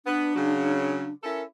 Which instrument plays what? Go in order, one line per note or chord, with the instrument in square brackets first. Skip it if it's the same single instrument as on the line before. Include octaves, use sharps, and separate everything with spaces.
[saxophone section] B3 [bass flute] D4
[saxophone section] C#3 F#3
[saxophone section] C#4 E4 A4 [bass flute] A#4